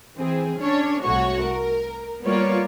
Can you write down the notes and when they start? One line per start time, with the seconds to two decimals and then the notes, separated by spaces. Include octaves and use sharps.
0.16 E3 C4 G#4
0.60 C#4 D4 C#5
1.04 C2 A3 F#4 C#5 F#5 C#6
1.43 A#4
2.23 G3 A#3 B3 F4 C#5 D5